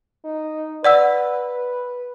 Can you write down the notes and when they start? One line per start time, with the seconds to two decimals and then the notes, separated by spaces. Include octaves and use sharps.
0.25 D#4
0.84 B4 D5 F#5 E6